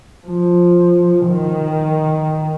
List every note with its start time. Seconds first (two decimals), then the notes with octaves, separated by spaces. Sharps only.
0.26 F3
1.28 D#3